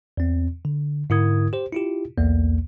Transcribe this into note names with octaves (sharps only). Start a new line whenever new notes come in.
E2 C4
D3
G#2 D3 E4 A#4 D#6 G#6
G4 C5
E4 F4 G4
B1 E2 A#3